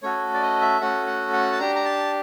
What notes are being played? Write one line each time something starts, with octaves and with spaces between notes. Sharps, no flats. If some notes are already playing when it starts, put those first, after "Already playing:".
A3 C#4 F#4 A4 C#5
D5
D#5
E5
A3 C#4 F#4 A4 F#5
F#5
F#5
A5
D4 G4 A#5
A#5
A5